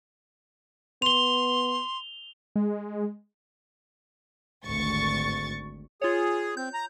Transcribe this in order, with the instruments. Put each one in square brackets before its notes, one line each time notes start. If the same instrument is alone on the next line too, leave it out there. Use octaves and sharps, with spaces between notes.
[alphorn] B3 [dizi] C6 [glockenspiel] F7 G7
[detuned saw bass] G#3
[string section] G#1 D2 C#6 A6
[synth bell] F4 C#5 [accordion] G#4
[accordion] C4 [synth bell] G6
[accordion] A#5